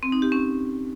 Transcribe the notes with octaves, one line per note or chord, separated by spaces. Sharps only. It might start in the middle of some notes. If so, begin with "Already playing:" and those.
C4
D#4
G4
C#4